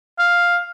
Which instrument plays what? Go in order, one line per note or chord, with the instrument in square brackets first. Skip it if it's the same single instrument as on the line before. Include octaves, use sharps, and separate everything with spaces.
[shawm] F5